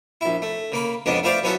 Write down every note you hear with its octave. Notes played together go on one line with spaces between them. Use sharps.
A#1 E4
A3
C#3 A#3 B5
F2 C#3 G#3 B3 D4
A3 E4 F4 C5 D5 F5
F#3 B3 C#4 E4 F#4 A4